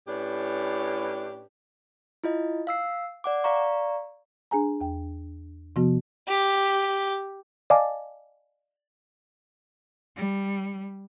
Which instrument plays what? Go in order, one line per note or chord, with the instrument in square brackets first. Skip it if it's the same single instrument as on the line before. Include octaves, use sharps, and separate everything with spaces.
[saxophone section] A2 C#4 D4 G4 B4
[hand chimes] E4 F4 D#5
F5 E6 C7
D5 F#5 D6
D5 F5 A#5 C#6
[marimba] D4 G#4 G#5 A#5
E2 G5
C3 F3 B3 F#4
[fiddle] G4
[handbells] D5 D#5 F5 G#5 A5 D6
[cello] G3